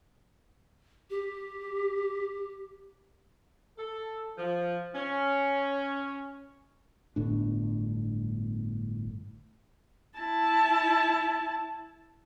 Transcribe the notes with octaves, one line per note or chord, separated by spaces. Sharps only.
G4
A4
F3
C#4
G1 A2 D4
E4 A5